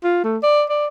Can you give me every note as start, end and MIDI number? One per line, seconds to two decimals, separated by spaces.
0.03 0.22 65
0.24 0.38 57
0.43 0.64 74
0.69 0.87 74